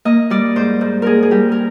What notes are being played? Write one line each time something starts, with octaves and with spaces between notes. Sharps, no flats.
A#3 D#5
G3 D5
G#2 C5
G#2
A#3 G#4 A#4
G#4
G3 G4
A#4